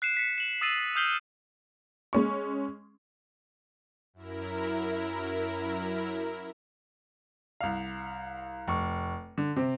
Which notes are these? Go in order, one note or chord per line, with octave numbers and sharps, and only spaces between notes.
F#6 C7 C#7 E7
B6 C#7
E7 F#7
D#6 E6 A6 C7 D#7 F#7
D#6 F6 G6 C7 F#7 G7
G#3 C#4 C#6
F#2 E4 A#4
C2 F5
F1 C#6
D3
C3 C4